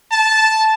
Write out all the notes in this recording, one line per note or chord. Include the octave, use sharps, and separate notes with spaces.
A5